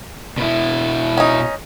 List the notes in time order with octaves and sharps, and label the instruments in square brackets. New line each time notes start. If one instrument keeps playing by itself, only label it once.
[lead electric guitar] B2 E4
[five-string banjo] C#4 D#4